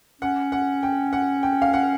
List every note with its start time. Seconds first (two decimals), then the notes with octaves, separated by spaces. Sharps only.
0.22 C#4 F#5
0.52 F#5
0.83 G5
1.13 F#5
1.43 G5
1.62 F5
1.73 F#5